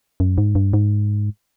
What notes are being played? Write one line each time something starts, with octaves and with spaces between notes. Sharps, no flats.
F#2
G#2
G2
G#2